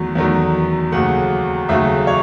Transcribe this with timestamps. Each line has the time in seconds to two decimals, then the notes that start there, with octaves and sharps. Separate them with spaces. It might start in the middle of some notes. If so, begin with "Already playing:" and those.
Already playing: E2 D#3 F#3 A3
0.15 E2 D#3 F#3 A3
0.92 D#2 C#3 F#3 A3 F#5
1.69 D#2 C#3 F#3 A3 E5
2.07 C#5